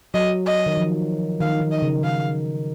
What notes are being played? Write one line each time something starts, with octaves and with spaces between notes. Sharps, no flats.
F#3 D#5
D#5
D#3
F3
D#3 F5
D#3
D#5
C#3
D#3 F5